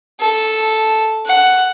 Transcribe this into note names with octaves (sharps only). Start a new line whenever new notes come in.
A4
F#5